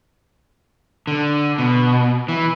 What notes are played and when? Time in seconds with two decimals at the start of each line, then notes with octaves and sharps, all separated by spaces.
1.07 D3
1.58 B2
2.28 E3